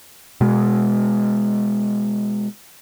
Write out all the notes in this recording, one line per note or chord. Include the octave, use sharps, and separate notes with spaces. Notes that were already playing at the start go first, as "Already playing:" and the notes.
B2 G#3